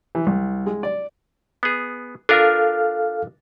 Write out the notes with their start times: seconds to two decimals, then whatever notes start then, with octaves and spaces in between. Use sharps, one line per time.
0.15 E3
0.27 C2
0.66 G#3
0.83 D5
1.63 B3 G#4
2.29 D4 F4 A4 A#4 F5 F6